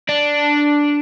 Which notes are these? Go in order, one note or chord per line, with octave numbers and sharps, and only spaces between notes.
D4